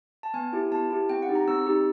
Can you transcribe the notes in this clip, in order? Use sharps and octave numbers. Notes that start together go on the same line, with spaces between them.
A5
B3 G#5
E4 G4
B3 A5
E4 G4
C4 G5
F#5
D#4 G4
A#5
C4 E6
D#4 G4